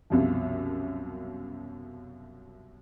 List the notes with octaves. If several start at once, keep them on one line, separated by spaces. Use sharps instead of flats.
C2 F#2 B2 F3